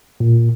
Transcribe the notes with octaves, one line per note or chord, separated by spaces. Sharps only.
A#2